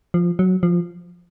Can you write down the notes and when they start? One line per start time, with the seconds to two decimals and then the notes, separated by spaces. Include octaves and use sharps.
0.14 F3
0.39 F#3
0.63 F3